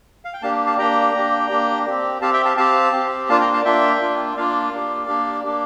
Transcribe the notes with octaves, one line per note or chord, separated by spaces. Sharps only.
F5
G5
A#3 D4 G4 F5 A5
F5 A5
A#3 D4 G4 G5 A#5
A#3 D4 G4
A#3 D4 G4
C4 G4
C4 G4 F5 A5
E5 G5
F5 A5
C4 G4 F5 A5
C4 G4
A#3 D4 F4 F5 A5
G5 A#5
F5 A5
A#3 D4 F4 E5 G5
A#3 D4 F4
A#3 D4 F4 D5 F5
A#3 D4 G4
A#3 D4 G4
A#3 D4 G4